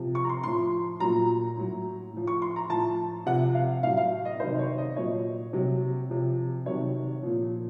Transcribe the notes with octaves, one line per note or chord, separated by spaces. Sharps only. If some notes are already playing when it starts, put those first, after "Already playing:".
Already playing: C3 F3
C#6
A#5
C6
A2 F3 C6
A#2 F#3 A#5
A2 F#3
A2 F3
C#6
C6
A#5
A2 F3 A5
C3 F3 F#5
F5
A2 F#3 F5
F5
D#5
C3 D#3 F#3 C5
C#5
D#5
A#2 F#3 C#5
C3 F#3
C3 F3
C3 D#3 F#3 C#5
A#2 F3